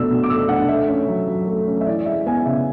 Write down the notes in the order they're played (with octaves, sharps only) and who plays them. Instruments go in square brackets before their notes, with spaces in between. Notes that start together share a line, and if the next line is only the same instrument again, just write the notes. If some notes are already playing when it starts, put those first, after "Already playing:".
Already playing: [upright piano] B2 A3 D4 E6
B2
D6
A3 E6
D4 F#5
A3 E5
C#4
F#3
F#3
A3
C#4
E5
E3 D5
G#3 E5
B3 G#5
C#3 E5